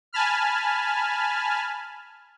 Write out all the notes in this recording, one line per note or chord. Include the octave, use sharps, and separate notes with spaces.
G#5 A5 B5 F6